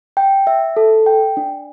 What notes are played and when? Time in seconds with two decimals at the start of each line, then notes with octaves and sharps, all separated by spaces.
0.17 G5
0.47 E5
0.77 A4
1.06 G5
1.37 D4